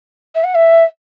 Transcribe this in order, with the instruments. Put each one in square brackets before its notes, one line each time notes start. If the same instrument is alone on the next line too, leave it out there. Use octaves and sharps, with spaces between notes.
[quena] E5
F#5
E5